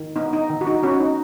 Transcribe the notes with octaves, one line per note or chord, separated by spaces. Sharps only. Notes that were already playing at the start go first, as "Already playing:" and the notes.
Already playing: D#3
B3 D#4
D#4
D#3
F#4
D#4
B3 C#4 F#4
D#4